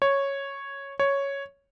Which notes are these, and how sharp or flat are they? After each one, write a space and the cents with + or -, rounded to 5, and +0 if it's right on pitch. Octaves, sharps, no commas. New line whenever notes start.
C#5 -5
C#5 +0